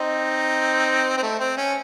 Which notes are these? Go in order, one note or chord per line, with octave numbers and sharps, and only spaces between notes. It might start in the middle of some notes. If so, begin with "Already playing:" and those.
Already playing: C4 D#4
C4
A3
C4
C#4